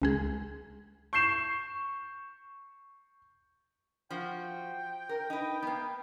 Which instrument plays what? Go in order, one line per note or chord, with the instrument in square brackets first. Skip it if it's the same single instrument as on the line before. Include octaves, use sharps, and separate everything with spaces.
[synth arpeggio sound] C#2 G#3 G#4
[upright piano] C#6 G6 C7 E7
[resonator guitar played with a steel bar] F3 F#4 [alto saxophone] G5
[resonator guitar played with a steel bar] A#4
D#4 B4
A#3 B3